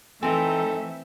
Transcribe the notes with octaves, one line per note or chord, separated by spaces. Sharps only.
E3 A3 C4 D#4 A4 A#4 E5 G#5